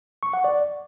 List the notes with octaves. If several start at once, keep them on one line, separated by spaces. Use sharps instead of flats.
C#6
F#5
D5